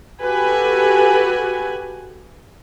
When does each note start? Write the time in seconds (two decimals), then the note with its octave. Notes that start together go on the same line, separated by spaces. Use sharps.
0.22 F#4 G4 A4 B4 G#5